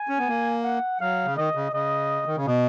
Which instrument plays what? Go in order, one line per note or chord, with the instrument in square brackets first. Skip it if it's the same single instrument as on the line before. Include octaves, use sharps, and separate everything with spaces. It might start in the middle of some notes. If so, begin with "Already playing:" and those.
Already playing: [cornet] G#5
[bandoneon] C#4
B3
A#3
[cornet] F#5
[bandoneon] F#3 [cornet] F5
[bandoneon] C#3
[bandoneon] D#3 [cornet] D#5
[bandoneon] C#3
[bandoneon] C#3 [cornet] D#5
[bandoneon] D#3
C#3
B2